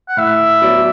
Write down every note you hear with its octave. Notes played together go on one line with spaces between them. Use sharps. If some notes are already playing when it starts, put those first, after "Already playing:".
F#5
A2 E5
F#3 B3 F#4 D5